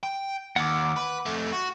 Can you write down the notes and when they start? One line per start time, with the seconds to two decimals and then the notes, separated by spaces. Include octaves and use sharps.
0.03 G5
0.56 D#2 F#5 D6
0.96 B4
1.26 F2 A3
1.52 F#4